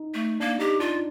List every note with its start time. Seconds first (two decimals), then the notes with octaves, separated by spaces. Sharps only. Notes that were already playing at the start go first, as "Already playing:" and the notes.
Already playing: D#4
0.14 A3
0.40 A#3 D4
0.60 D#4 G4
0.80 D4 F4